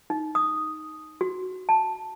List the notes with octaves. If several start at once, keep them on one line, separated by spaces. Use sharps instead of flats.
D#4
D#6
F#4
A5